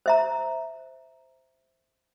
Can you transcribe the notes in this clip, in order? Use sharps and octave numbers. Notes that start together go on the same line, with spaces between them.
C5 E5 A#5